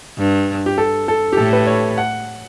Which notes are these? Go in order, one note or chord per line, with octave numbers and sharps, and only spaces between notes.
G2
G4
A4
A4
G4
A2 A4
B4
C#5
F#5